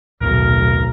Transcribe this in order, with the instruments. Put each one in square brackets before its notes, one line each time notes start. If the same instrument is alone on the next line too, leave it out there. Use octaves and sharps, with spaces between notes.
[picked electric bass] D#1 A2 [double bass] B1 [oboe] A#4